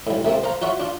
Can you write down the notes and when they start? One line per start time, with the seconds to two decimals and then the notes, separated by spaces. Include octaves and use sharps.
0.07 B1 A2
0.25 C3 A3 A#3 C4
0.44 C5 F5 A#5
0.62 F4 F#4 C#5 E5
0.80 D4 F4